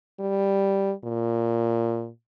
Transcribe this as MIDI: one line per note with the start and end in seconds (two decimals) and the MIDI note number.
0.20 0.93 55
1.05 2.10 46